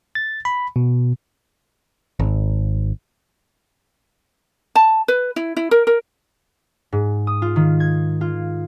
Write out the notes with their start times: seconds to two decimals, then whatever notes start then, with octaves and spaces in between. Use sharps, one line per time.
0.15 A6
0.45 B5
0.76 B2
2.19 G#1
4.75 A5
5.08 B4
5.36 E4
5.57 E4
5.71 A#4
5.87 A#4
6.92 G#2
7.27 D#6
7.42 F4
7.56 D#3
7.80 G#6
8.21 F4